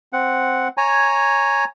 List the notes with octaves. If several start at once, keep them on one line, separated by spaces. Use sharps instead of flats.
C4 F#5
C#5 G#5 A#5